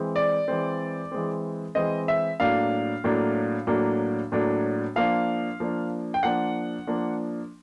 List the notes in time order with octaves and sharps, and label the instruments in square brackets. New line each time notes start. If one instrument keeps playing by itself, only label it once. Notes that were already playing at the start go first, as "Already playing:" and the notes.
Already playing: [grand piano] E3 G#3 C4
D5
E3 G#3 C4
E3 G#3 C4
E3 G#3 C4 D#5
E5
A2 F#3 A#3 D4 F5
A2 F#3 A#3 D4
A2 F#3 A#3 D4
A2 F#3 A#3 D4
F3 A#3 D4 F5
F3 A#3 D4
G5
F3 A#3 D4 F#5
F3 A#3 D4